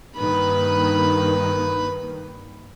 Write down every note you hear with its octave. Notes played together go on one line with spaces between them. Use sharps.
G2 D#3 A#3 B4 B5